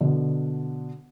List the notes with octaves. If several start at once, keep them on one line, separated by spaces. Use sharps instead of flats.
B2 D3